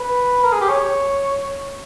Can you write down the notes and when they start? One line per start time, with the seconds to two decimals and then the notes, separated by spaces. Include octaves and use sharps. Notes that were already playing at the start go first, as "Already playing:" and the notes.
Already playing: B4
0.43 A#4
0.53 G#4
0.61 G4
0.69 C#5